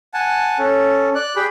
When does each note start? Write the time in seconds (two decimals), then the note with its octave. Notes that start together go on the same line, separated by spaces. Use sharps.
0.14 F#5 G#5 A5
0.59 C#4 A4
1.15 D5 F#6
1.36 G4 G#4 G5 B5